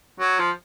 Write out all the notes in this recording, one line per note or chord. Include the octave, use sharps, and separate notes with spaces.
F#3
F3